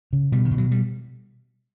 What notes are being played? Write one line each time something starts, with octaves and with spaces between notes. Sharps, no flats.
C#3
B2 G3
D#3
B2
F#3
G3